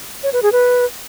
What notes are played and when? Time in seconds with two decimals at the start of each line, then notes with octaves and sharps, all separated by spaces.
0.23 C#5
0.33 B4
0.43 G#4
0.52 B4